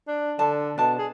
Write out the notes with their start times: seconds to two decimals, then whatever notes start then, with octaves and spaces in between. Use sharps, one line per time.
0.08 D4
0.39 D3 A5
0.78 B2 D4 A5
0.99 G#4